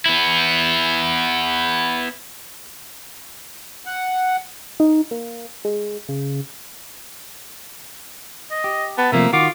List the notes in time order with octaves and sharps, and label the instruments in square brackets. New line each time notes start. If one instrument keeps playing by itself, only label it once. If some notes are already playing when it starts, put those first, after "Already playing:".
[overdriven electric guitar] B3 E4
[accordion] F#5
[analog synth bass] D#4
A#3
G#3
C#3
[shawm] D#5
[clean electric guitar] G4
[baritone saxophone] B3 [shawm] A5
[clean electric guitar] C3 F3 A3 [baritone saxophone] A#3 [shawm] E5
[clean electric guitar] D#3 F#4 [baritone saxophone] F4 [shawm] D6